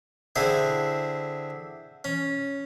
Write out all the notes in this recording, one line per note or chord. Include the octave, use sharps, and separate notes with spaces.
D3 C4 E4 G#4
C#4